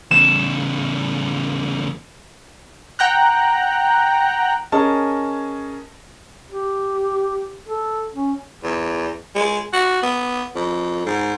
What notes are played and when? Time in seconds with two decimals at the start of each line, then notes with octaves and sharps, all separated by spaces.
0.11 E2 C#3 E7
2.99 F#5 G5 A#5 F#6
4.72 C#4 G#4 A#4 D#5 A5
6.51 G4
7.68 A4
8.14 C#4
8.63 E2
9.35 G#3
9.73 F#4
10.03 B3
10.55 F2
11.06 G#2